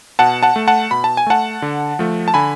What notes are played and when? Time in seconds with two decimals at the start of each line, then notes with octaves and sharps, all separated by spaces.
0.19 B2 F#5 A5
0.43 F#5 A5
0.56 A3
0.68 F#5 A5
0.91 B2 B5
1.04 A5
1.17 G#5
1.26 A3 F#5 A5
1.62 D3
1.99 F3 A3
2.28 A5
2.34 D3 G#5 B5